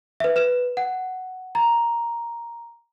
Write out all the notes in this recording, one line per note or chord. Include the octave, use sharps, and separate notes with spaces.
B4 E5
B4 E7
F#5
A#5